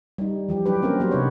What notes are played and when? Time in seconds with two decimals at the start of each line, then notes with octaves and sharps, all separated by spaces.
0.18 G3 D#4
0.49 E3 F3 G4
0.65 F#3 D4 G4 B4
0.82 A#3 C4 C#4 A#4
1.00 F#3 B3 F#4 G4 C5
1.11 C3 D#4 B4 C#5